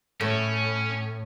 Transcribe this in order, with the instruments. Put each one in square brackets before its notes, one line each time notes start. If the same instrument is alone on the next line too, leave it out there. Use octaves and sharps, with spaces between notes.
[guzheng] A2 [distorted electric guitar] C#4